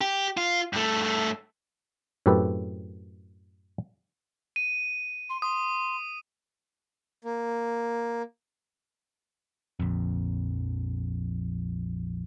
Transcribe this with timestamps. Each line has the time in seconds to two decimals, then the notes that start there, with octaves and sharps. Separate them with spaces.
0.01 G4
0.37 F4
0.73 G2 A3
2.26 F#2 A2 C4 G4 A4 B4
4.56 D#7
5.30 C6
5.42 C6 D#6
7.22 A#3
9.80 A#1 F2